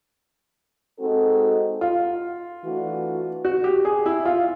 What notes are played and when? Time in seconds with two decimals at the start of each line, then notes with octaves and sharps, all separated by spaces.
1.00 G#3 C4 D#4 F#4 A4
1.81 F4
2.63 E3 A3 D4 F#4
3.45 F#4
3.64 G4
3.85 G#4
4.06 E4
4.25 F4